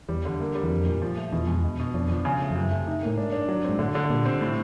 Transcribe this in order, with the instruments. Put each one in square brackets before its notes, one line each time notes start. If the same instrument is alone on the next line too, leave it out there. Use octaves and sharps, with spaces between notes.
[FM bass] E2 [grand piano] G3
[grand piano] D3
A#3
G3
[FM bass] E2
[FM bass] F2 [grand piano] A#3
[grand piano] A#2
F3
A3
[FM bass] E2 [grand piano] B2
[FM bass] F2 [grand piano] G#3
[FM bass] E2 [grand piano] B2
[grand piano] B2
[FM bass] F2 [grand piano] D4
[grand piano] F3
C#3
A3
[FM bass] F2
[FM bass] F#2 [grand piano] C3
[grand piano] A3
D#4
[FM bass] A2 [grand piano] A#3
[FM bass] G#2 [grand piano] D4
[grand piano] D4
F#3
C4
[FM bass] G#2
[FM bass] A2 [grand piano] D3
[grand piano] D3
[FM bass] A#2 [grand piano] G3
[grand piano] C4
A2